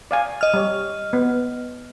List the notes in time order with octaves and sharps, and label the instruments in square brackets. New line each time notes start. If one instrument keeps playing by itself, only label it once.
[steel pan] D5 F5 G#5
[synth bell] D#5 F6
[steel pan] G3 C#5
B3